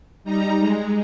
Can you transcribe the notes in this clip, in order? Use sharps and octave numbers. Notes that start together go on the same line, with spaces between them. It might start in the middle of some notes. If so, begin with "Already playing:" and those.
G3 D#4 A#5
G#3